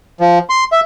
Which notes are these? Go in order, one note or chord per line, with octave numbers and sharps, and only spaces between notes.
F3
C6
E5